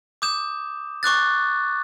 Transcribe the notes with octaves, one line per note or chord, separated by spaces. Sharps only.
D6 D#6 G6 E7
C#6 D6 F#6 A6